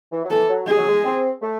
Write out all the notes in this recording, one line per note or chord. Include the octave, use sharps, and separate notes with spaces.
E3
F#3
E3 A4
F#3
G#3 G#4
F#3
G#3
C4
A3